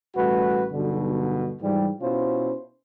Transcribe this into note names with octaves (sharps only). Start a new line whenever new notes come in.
A1 G3 A3 F#4 B4
B1 G2 B2 D3
G#2 E3 F3 G3
B2 C#4 E4 F4 C5